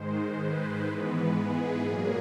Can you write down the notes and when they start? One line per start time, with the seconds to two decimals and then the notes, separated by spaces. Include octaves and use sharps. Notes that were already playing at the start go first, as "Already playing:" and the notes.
Already playing: G#2 D#3 G#3 C5
0.38 B4
0.87 G#2 E3 G#3 B3
1.36 G#4
1.85 A#2 F#3 A#3 G#4